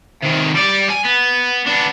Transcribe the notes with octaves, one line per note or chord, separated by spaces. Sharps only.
C3 D#3
G3 D5
G#5
B3
B3 D4